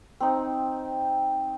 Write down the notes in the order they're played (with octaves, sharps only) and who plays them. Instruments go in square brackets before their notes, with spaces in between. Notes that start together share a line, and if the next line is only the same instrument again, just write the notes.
[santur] C4 D#4